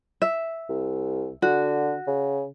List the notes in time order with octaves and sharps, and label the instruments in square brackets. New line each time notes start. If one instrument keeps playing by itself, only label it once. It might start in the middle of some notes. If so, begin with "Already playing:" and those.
[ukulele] E5
[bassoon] C2
[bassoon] D3 [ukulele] F#4
[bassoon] C#3